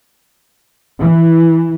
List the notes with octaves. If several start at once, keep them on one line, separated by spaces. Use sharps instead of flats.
E3